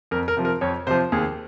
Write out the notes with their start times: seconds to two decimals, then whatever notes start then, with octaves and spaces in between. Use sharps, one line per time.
0.11 F2 A#4
0.28 A#4
0.37 C3 F3
0.45 A#4
0.61 F2 C#5
0.87 C3 F3 C5
1.12 D#2 G#4